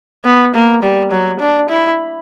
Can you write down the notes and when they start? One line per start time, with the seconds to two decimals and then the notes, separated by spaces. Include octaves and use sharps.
0.25 B3
0.54 A#3
0.83 G3
1.11 F#3
1.39 D4
1.69 E4